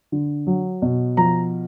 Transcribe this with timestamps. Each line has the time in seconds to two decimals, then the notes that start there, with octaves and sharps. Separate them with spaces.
0.12 D3
0.47 F#3
0.82 B2
1.17 F3 A#5